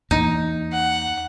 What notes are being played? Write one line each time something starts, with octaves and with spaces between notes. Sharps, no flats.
E2 E3 A#3 D#4
F#5